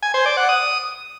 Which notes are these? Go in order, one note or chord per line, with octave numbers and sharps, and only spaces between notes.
G#5
C5
D5
F#5
D#6